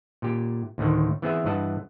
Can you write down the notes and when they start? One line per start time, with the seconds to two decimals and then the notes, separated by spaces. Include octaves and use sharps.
0.22 A#2 G4
0.78 D2 A2 D3 D#3
1.22 E3 B3 C4 G#4 E5
1.45 G2 E3 D#5 F#5 A5